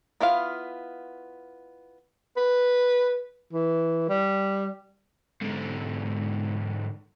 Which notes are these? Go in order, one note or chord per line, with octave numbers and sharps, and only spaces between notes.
B3 E4 F4 F5
B4
E3
G3
G#2 D3